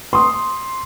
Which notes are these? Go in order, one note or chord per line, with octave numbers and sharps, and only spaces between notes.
C6 D#6